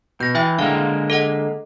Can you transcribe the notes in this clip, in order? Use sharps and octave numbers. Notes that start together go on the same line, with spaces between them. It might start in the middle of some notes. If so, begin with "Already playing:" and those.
B2 G6 A#6
E3 E4 E5 G5
D3 G#3 A#3 F5
A4 D#5 F#5